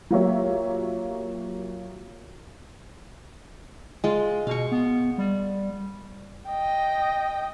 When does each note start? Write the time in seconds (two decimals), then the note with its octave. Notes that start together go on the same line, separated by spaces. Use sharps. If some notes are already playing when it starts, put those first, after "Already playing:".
0.10 F#3 A#3 F4 G4 C#5 E5
4.04 G#3 F4
4.47 B2 F5 C#6
4.72 B3
5.18 G3
6.47 D#5 G5